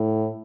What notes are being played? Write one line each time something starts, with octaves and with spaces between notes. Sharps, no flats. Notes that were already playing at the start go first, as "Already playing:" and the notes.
Already playing: A2